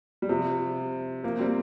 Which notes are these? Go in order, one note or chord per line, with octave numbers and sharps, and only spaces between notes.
G3
C3 F3
F3 A#3
G3 C4